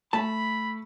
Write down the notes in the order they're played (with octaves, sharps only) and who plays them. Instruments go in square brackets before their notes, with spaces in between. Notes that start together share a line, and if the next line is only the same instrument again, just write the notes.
[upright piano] A3 [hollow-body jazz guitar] A5 [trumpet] B5